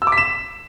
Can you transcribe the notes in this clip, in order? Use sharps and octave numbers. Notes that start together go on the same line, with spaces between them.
E6
D6
B6
E7